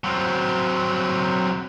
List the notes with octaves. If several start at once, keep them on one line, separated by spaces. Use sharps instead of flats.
F#3 C4